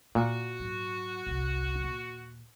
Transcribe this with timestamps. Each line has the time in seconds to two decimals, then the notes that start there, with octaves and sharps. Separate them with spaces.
0.15 A#2 D3 F#4
0.60 G#2 F#3
1.27 G1 C2
1.80 D#2 A#2